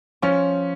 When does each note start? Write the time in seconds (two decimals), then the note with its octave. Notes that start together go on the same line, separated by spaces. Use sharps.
0.22 F3 C#4